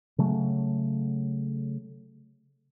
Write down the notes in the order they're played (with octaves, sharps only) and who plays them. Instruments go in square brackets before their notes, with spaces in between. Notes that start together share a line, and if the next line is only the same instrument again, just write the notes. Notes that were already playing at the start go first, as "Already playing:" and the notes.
[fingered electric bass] C#3 F#3 A3